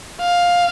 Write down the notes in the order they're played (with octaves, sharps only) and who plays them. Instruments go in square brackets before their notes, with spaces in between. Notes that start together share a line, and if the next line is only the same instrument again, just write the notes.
[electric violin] F5